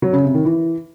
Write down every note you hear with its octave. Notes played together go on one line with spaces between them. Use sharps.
F#3
C#3
C3
D#3
E3